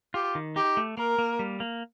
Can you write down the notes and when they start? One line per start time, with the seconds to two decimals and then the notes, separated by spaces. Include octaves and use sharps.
0.14 F4 G4
0.35 D#3
0.56 D#4 G4
0.77 A3
0.97 A#3 A#4
1.18 A#3
1.39 G3
1.60 A#3